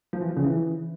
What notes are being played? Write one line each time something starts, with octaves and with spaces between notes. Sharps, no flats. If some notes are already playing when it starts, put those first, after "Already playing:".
F3
E3
F3
C#3
E3